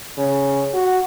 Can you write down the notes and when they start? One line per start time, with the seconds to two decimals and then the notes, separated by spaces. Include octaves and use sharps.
0.17 C#3
0.74 F#4